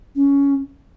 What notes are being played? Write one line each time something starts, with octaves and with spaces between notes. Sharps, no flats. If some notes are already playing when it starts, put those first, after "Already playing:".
C#4